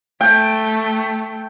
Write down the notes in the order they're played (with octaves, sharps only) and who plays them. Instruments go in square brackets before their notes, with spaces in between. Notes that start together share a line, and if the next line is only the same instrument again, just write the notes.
[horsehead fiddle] A3 [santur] G5